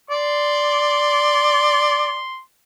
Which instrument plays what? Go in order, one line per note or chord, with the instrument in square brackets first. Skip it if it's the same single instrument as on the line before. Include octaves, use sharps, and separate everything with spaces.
[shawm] D5 [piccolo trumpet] C6